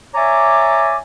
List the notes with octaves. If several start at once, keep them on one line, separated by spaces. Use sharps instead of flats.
C#5 D5 E5 G#5 A#5 D6